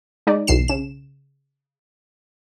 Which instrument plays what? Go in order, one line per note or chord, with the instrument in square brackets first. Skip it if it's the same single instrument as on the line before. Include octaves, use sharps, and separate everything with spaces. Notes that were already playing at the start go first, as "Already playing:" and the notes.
[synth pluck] G#3 D#4 D5
B1 E2 B2 C7 E7
C#3 E7